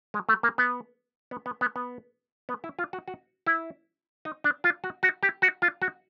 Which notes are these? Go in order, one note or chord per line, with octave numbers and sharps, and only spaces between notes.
G#3
A3
A#3
B3
B3
B3
B3
B3
B3
E4
F4
F#4
F#4
E4
D#4
D4
F4
F#4
F#4
G4
F#4
F4
F#4